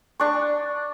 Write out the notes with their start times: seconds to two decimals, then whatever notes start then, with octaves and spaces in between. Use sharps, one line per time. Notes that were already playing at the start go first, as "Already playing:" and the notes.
0.19 D4 C#6